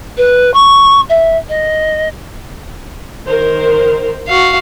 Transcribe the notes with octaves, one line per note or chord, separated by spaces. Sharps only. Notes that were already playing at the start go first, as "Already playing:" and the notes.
B4
C#6
E5
D#5
D#3 A#4 C5
F#4 F5